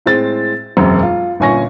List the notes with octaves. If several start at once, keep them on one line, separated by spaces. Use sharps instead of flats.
A2 G#3 C4 A6
E1 F#2 C4
F4
G1 A#2 C#4 G#5 C#6 A#6